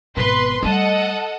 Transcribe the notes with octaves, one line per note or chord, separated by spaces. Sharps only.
G#1 B2 B4 C6
G3 A3 A4 D#5 F#5